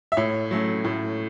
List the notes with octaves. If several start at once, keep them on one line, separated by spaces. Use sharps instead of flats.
E5
A2 C#5
F#3 A3 C#4
A2